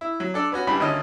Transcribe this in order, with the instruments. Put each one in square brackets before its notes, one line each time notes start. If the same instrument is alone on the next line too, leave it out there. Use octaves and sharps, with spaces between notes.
[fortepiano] E4
F#3
D4 A4 D5
B3 C#4 F#4
C#2 G2 G3 D4 B5
D2 D#3 C#4 D#5 A5